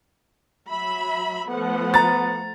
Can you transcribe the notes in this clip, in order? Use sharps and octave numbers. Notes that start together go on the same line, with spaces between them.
F#3 E5 B5
F3 A3 B3 F#5
A#5 A6